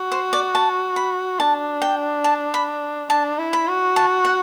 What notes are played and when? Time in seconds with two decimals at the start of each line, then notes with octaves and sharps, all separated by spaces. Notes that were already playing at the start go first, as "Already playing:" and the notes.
Already playing: F#4
0.12 C5
0.33 D5
0.55 A5
0.96 B5
1.40 D4 A5
1.82 G5
2.24 A5
2.54 B5
3.10 D4 A5
3.39 E4
3.53 B5
3.67 F#4
3.96 A5
4.25 F#5